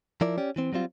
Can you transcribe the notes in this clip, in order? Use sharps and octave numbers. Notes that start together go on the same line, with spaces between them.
F3 E4 A#4 D5
C#4 G4 D5
E3 C4
F#3 G3 C4 F4